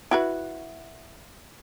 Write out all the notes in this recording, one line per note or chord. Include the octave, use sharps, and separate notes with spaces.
E4 F#4 B4